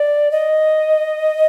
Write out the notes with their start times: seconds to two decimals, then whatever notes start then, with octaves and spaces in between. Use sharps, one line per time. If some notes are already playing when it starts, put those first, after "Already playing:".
Already playing: D5
0.31 D#5